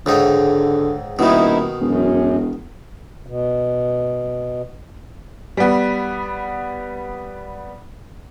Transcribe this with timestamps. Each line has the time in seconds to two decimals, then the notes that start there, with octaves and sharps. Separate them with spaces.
0.06 C#2 G#2 D3 D#4
1.19 D#1 B2 D#3 D#4 E4
1.81 E1 F#2
3.26 B2
5.57 G3 B3